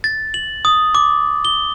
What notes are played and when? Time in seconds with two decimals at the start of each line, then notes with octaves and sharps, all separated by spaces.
0.04 A6
0.34 F#7
0.65 D#6
0.95 D6
1.45 G7